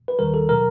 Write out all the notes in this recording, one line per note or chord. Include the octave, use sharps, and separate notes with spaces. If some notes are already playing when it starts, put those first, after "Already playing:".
B4
D#2 D#3 G3 A#4
A4
B2 F#3 A#4